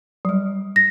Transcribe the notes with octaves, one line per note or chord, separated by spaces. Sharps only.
F#3 G3
A#6